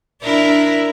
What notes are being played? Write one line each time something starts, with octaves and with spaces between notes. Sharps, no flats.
D4 E4 A#4